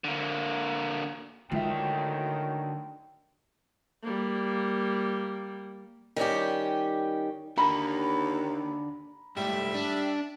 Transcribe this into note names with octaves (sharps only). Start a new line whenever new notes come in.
D3 A#3
D2 A2 D#3 F#3 G#3 F4 E5 G5
G3 A#3
D#3 G3 C#4 G4
D#2 D3 A#5 B5
G#2 G3 A3 E5
D4